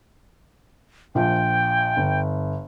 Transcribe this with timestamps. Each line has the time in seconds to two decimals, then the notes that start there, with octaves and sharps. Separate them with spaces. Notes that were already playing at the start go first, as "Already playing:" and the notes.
1.15 A#1 F3 F4 G5
1.97 G1